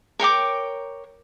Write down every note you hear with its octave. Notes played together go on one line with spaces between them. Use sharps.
A#4 C#5 G5 D6